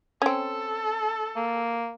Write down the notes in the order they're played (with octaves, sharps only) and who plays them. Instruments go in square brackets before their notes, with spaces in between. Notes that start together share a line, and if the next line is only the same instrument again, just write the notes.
[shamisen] C4 C#4 [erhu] A4
[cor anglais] A#3